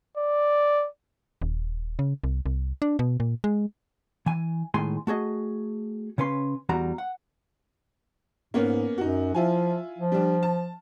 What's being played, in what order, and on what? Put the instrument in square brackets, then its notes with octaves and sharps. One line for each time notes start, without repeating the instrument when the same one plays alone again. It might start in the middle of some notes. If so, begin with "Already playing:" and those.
[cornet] D5
[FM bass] D#1
C#3
C2
C2
D4
B2
A#2
G#3
[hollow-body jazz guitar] E3 G#5
A2 D#3 G#3 G#5 C6
A3 F#4 G#4 D#5
C#3 C#4 B4 C6
E2 G3 F#4 A#5
F#5
[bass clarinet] G#2 [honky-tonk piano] A#3 B3 C#4
[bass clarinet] F#2 [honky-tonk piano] D#4 F#4
[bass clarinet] F3 [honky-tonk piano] E4 F4 G#5
[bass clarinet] F3
[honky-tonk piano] G3 D4
A5